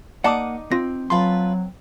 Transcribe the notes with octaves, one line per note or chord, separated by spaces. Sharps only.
A#3 D#4 D5 F#5 A5 D6 D#6
C4 F4 A#6
F#3 F4 B4 A5 C6